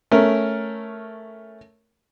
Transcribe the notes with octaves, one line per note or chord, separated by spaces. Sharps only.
A3 C#4 A#4